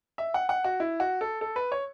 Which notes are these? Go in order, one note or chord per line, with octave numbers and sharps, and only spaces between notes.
E5
F#5
F#5
F#4
E4
F#4
A4
A4
B4
C#5